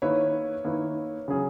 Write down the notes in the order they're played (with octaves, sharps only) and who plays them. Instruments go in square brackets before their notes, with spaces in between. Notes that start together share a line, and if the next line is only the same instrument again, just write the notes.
[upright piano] D#3 A#3 E4 B4 [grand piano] C#5
[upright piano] D#3 A#3 E4 B4
C#3 F#3 C#4 G#4